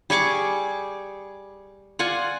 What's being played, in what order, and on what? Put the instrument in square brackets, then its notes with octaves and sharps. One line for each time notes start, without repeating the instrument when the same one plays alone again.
[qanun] G3 G#4 C#6 D6
F4 D5 F#5 G#5